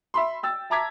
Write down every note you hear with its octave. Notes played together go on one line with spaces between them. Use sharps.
E5 B5 C6
G5 E6 A6
E5 A5 A#5 D6 G#6 B6